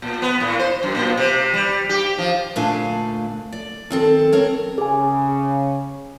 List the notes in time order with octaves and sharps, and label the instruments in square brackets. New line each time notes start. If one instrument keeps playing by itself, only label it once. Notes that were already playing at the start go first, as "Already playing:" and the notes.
[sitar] A#2
B3
A2
C5
F#2
A#2
C3
G3
G4
F3
[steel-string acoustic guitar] D2 A#2 A3 D4 F5 G#5
D5
D#3 C4 A4
C4 A#4 C#5
[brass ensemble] C#3 [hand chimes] G#4 G#5